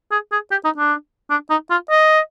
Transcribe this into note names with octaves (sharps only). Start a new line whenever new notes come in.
G#4
G#4
G4
D#4
D4
D4
D#4
F4
D#5